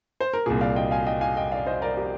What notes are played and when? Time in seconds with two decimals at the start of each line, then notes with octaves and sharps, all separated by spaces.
0.20 C5
0.33 A#4
0.46 C2 A#2 G#4
0.61 D5 F5
0.76 D#5 G5
0.91 F5 G#5
1.06 D#5 G5
1.21 F5 G#5
1.37 D#5 G5
1.52 D5 F5
1.67 C5 D#5
1.82 A#4 D5
1.97 G4 A#4